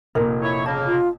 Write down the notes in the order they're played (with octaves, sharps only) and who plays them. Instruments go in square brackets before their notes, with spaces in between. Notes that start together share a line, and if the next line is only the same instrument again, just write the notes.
[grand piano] F1 A#2 [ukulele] A#4
[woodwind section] E4 C#5
[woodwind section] C#3 A#3 [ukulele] A5
[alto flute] F4